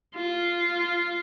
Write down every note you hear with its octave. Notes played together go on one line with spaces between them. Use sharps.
F4